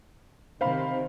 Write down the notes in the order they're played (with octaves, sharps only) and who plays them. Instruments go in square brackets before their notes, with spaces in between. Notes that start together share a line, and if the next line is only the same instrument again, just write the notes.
[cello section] C3 D#3 [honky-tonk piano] C5 F5 B5